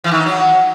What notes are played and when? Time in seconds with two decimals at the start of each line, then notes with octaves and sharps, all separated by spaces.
0.04 E3
0.11 D#3
0.19 D#4
0.26 F#3